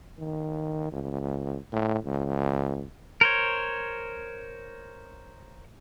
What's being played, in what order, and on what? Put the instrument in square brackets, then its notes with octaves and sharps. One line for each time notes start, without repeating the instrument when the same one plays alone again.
[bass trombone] D#3
C#2
A2
C#2
[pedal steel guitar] A#4 C5 C#5